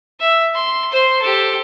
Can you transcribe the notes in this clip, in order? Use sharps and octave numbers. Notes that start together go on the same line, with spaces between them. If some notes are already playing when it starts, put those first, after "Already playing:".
E5
C6
C5 C6
G4 A4